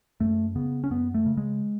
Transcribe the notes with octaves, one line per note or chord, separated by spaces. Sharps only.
F#2 A3
C#3 B3
C#4
F#2 B3
A3
C#3
G#3